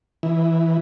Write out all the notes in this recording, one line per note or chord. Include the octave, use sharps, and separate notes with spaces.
E3